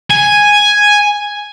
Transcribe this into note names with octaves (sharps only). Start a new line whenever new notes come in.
G#5